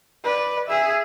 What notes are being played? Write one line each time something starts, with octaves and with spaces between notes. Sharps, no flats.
B4 D5
G#4 E5